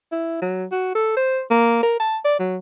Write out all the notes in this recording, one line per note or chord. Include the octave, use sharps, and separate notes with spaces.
E4
F#3
F#4
A4
C5
A#3
A#4
A5
D5
F#3